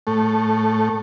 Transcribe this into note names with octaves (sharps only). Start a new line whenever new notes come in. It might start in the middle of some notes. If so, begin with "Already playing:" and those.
A2 A3